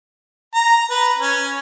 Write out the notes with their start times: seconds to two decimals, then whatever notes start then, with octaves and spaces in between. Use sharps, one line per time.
0.55 A#5
0.90 B4
1.18 C#4